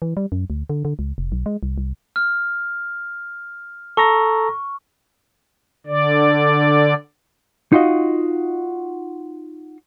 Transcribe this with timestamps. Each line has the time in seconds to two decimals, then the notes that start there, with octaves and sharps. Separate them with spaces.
0.02 E3
0.17 G3
0.32 F#2
0.50 D2
0.70 D3
0.85 D3
0.99 C#2
1.18 F1
1.32 B1
1.46 G#3
1.63 C2
1.78 C2
2.16 F6
3.97 A4 A#5 C#6 A#6
5.86 D3 D5
7.72 D#4 F4 F#4 D#5